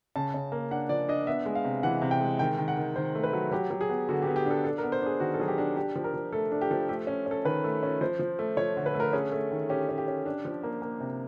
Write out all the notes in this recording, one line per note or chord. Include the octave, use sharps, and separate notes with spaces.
C#3 A5
C#3
A#3
D4 F#5
F3 D5
D4 D#5
B3 E5
G#3
F5
C3
E3 F#5
C3
G5
G#3
D#3 G5
D#3
F#5
D#3
D#3 C5
A3
B4
F#3
F#3 G4
F#3
G#4
B3
D3 F#4
G4
B3
G4
D4 A4
D4 A4
A#4
B3
C5
D4 G#4
D#3 F#4
A4
F#3 G#4
G4
D4
D4 G4
F3
A#4
F3
A3 A4
D4
G4
F3
A3 G4
C#4
C#4 A4
D#3 B4
A3
C#4
F3 C5
F3
A3
F3 C#5
D3
B4
A3
A#4
C#4 G#4
A3
D#3
C#4 G4
C#4
G4
C#4
D4
F3
A#3
A#3
C3